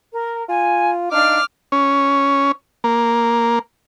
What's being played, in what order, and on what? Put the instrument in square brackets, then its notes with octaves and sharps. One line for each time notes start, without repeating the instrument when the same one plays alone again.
[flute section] A#4
[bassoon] F4 [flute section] G#5
[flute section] D4 F5 [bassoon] D#4 [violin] D6 F6
[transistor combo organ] C#4
A#3